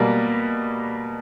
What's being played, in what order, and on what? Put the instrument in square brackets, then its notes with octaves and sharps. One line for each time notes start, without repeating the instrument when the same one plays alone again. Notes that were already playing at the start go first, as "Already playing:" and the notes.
Already playing: [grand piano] B2 G3 A#3